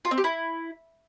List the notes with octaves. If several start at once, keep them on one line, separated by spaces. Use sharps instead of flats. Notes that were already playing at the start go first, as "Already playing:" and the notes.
F4
C4
G4
E4